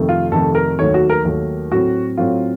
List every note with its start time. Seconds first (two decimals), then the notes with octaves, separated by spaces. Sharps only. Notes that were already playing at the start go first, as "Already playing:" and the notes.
Already playing: F2 C3 D#3 A3
0.09 F4
0.32 F2 C3 D#3 A3 A4
0.55 A#4
0.79 D#2 D#3 F#3 A3 C#5
0.94 F#4
1.09 A#4
1.25 D#2 D#3 F#3 A3
1.72 A2 F#3 C4 F#4
2.17 A2 F#3 C4 F4